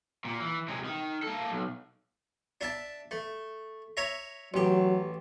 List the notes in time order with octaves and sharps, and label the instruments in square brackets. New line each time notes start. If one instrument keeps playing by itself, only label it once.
[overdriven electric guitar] A#2 A#3
E3
C3 G#3
D#3
A#3 A4
B1
[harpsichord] D4 E5 A5
A3
C#5 E5 A#5
[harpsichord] A1 G4 [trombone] F#3